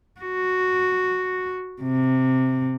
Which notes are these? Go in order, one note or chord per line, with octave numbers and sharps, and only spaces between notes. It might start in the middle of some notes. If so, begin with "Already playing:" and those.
F#4
C3